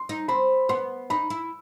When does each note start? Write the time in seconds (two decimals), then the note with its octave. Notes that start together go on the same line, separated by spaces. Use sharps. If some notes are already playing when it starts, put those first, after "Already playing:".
Already playing: C6
0.09 D#4
0.28 C4 B5
0.69 B3 C6
1.10 D#4 B5
1.30 E4